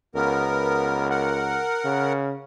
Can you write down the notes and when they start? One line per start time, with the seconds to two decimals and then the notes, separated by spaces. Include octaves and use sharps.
0.15 C#2 B3 A#4
1.10 A#4 F#5
1.84 C#3